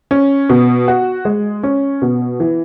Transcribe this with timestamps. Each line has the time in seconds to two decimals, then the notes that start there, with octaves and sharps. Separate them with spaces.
0.11 C#4
0.49 B2
0.88 F#4
1.25 G#3
1.63 C#4
2.02 B2
2.40 E3